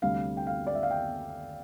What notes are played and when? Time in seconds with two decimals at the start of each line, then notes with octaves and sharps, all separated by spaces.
0.02 D2 C3 G3 D4 F5
0.37 G5
0.47 F5
0.67 D5
0.75 E5
0.83 F5
0.91 G5